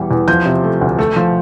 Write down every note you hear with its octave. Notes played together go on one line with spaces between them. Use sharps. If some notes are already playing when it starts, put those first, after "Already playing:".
Already playing: E2 E3 G3
E2
F3 G6
C3
A3
D2
A3
F3